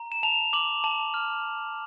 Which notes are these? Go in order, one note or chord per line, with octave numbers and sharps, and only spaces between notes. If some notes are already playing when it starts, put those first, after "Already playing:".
Already playing: A#5
E7
A5 F7
D6 F#7
A5 F#7
F6